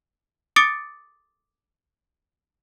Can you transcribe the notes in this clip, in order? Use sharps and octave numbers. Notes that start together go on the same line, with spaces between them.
D6 D#6 A6 C#7 D7